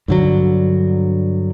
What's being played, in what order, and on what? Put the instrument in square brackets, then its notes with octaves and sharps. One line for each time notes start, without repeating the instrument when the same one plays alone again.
[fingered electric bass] G2 D3 F#3